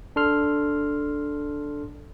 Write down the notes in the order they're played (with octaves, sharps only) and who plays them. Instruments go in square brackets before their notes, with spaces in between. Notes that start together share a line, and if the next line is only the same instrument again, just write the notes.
[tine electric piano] D4 A4 C6 F6